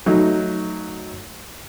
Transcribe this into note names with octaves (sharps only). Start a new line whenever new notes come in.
F#3 A3 D#4